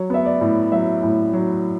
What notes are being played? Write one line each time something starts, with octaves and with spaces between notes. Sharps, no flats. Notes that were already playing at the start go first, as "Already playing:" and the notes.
Already playing: F#3 C#5
B3 E5
D5
A2
F#3 E5
A2
F#3